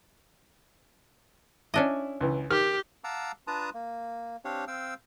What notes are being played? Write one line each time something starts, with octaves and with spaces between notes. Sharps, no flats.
C#4 D4 E4 D#5
C#2 E3
D#3 G4 F6
F5 F#5 A5 A#5 D6 E6
D4 F4 B4 A5 A#5 D#6
A#3
C4 D4 G4 C#5 F5
C4 F5 G5 E6